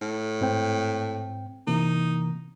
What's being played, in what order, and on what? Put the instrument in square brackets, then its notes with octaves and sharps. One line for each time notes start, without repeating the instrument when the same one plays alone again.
[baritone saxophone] A2
[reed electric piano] G#2 C4 G5
[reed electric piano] C3 E3 A#3 [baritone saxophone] D#4